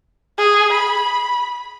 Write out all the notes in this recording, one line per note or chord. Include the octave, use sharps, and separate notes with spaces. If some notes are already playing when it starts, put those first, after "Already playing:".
G#4
B5